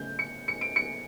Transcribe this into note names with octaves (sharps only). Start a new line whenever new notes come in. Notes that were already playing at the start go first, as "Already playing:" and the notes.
Already playing: C#3 A3 C#4 G6
C#7
C#7
D7
C#7